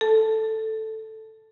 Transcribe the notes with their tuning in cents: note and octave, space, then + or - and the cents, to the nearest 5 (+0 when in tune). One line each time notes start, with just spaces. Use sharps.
A4 +0 A5 +0